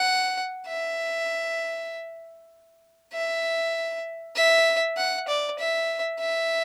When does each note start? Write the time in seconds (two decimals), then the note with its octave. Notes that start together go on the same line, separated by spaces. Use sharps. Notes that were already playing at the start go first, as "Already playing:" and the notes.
Already playing: F#5
0.67 E5
3.13 E5
4.36 E5
4.97 F#5
5.28 D5
5.59 E5
6.20 E5